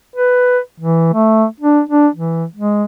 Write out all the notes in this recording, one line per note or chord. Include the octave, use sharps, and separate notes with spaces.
B4
E3
A3
D4
D4
E3
G#3